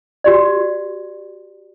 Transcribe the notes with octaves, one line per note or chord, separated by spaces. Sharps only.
F#4 G4 D5